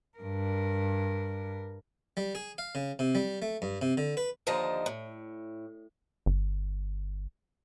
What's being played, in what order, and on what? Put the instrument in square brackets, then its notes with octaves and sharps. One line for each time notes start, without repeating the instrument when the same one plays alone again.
[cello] G2 A#4
[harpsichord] G3
G#4
F5
C#3
C3
G3
A3
G2
C3
D3
B4
[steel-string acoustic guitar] D#2 D3 F3 C5 D#5 A#5
A2
[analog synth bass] G1